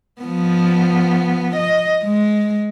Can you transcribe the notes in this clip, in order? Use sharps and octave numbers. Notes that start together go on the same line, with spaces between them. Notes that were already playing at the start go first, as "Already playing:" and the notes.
F3 B3
D#5
G#3